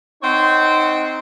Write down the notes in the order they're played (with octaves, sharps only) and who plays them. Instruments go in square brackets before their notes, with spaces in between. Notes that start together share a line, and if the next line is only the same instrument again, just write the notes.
[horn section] C4 D#4 C#5 F#5 C6